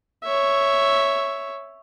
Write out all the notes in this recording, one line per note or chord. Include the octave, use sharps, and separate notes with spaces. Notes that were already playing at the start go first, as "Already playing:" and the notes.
C#5 E5